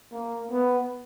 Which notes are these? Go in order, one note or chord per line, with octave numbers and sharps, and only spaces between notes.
A#3
B3